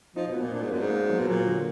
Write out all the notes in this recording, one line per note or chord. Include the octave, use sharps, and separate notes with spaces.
F3 D#4
B2
B3
A#2
A#2 D4
G#2
F#2 B3
G#2
A#3
F#3
B2
A#2 F#3
D3